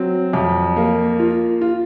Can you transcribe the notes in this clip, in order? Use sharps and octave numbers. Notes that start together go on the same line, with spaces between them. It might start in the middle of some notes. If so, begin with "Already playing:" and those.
Already playing: F#3 C4
F2
A#3
F4
F4